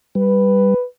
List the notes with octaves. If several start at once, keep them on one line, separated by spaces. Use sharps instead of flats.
G3 B4